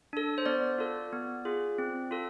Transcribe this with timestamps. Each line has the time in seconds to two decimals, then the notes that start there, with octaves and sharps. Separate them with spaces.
0.13 D4 A4
0.38 C5
0.46 B3 D5
0.78 F4 A4
1.13 B3
1.45 F4 G#4
1.78 C4
2.11 F4 A4